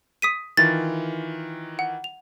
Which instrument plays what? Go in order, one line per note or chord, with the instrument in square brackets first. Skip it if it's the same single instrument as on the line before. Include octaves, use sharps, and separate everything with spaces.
[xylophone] D#6 B6 D#7
[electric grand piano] D#3 E3 F4 [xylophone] A6
[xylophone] F#5
F7